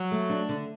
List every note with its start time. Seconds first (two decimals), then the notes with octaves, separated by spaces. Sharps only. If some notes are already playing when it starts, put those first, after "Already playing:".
Already playing: F#3
0.11 A3
0.30 D4
0.49 D3